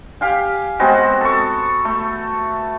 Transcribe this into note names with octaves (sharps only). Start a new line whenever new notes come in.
G4 F5 G#5
G#3 B3 C4 F#4
A4 C#6
A3